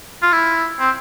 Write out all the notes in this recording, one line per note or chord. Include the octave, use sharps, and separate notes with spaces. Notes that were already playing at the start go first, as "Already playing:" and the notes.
F4
E4
C4